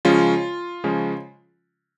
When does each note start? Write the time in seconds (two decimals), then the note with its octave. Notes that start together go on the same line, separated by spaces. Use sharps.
0.05 C#3 F3 G#3 C#4 F4
0.84 C#3 F3 G#3 C#4